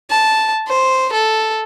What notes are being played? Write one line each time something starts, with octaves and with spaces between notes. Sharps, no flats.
A5
C5
A4